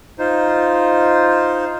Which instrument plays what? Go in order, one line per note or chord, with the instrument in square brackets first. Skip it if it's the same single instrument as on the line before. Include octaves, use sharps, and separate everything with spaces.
[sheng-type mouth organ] D#4 F4 C5